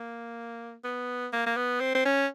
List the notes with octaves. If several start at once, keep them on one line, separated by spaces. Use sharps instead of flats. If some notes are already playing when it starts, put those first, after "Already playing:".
Already playing: A#3
B3
A#3
A#3
B3
C4
C4
C#4